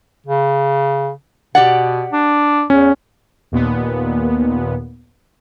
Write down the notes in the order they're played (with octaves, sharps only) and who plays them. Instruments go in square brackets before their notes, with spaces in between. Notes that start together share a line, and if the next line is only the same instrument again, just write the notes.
[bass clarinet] C#3
[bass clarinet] B2 [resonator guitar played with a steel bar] G4 D5 F#5
[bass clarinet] D4
[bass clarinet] E2 [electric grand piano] C#4
[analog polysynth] D#2 A#2 B3